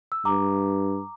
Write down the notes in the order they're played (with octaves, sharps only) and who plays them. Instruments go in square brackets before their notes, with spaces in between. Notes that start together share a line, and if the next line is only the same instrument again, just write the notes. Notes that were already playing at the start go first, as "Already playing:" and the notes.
[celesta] E6
[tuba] G2 [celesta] A#5 D6